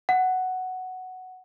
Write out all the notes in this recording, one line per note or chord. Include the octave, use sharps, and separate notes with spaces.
F#5